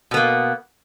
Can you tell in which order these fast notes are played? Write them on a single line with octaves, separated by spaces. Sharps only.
B2 B3 A#3